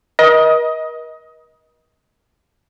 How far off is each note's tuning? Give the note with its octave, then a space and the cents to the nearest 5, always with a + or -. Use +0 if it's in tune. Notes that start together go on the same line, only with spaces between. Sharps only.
A#4 +45 D#5 +15